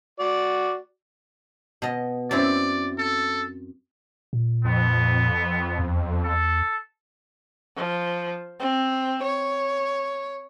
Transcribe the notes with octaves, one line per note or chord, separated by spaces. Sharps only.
F#4 D5
B2 D#5
F#2 C4 E4 D5
A4
A#2
F2 B3
E2
A4
F3
C4
C#5